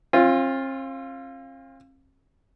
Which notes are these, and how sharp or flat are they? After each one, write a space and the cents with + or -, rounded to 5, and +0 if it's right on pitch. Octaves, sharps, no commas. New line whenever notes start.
C4 +45 F4 +0